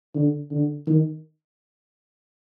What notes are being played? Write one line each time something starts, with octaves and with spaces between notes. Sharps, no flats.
D3
D3
D#3